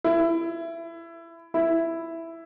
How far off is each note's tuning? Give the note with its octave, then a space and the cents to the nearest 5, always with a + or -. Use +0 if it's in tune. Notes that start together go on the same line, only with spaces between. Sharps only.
E4 +20
E4 +5